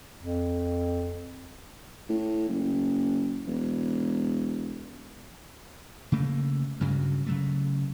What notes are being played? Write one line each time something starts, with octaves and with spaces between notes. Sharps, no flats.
F2
A2
F#1
E1
C#3 A3 A#3
D2 G2 C#3 F#3
C#3 F#3 A3